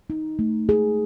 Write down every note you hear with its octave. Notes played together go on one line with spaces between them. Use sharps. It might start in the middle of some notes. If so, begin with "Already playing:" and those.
D#4
A3
G#4